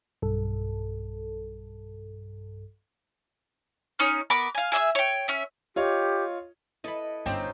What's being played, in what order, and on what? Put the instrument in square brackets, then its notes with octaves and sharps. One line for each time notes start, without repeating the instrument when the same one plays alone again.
[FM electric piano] B1 G2 A4
[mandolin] C#4 D#4 F6
B3 A#4 B5 D6
F5 G#5
G#4 E5 D6 E6
C#5 G5
C#4 E5
[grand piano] F4 C#5 D#5 [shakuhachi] G4
[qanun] E4 A4 B4 [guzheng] D#5 B5
[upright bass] G1 [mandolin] C4 F4 [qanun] C#4 D#4 A#5 [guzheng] G4